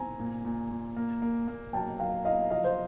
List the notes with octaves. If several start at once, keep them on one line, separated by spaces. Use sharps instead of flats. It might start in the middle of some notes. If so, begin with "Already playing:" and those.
Already playing: C4 G#5 A#5
A#2
A#2
A#2
A#3
A#3
A#3
F#3 G5 A5
F#3 F5 G5
E4 D#5 F5
F3 D#5 F5
C5